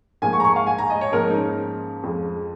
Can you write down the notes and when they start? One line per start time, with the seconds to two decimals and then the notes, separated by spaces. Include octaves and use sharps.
0.22 G#2 F3 A#3 G#5
0.33 C#6
0.40 A#5
0.44 C#6
0.56 F5
0.67 G#5
0.78 A#5
0.90 D#5
1.01 C#5
1.12 G#2 F3 A#3 A#4
1.30 D#4
1.35 C#4
2.03 F2 F3 G#3